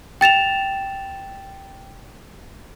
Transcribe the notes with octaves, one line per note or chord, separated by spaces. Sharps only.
G5 A6 E7 F7